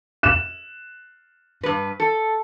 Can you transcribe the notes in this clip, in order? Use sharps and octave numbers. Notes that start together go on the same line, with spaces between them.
F#6 E7
G2 B4
A4